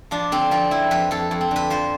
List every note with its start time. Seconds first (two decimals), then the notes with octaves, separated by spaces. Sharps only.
0.11 F3 D4
0.32 D3 C4
0.51 F3 C4
0.71 F3 E4
0.91 F2 B4
1.11 F2 A4
1.31 F2
1.41 C4
1.51 D3 B4
1.70 F3 C5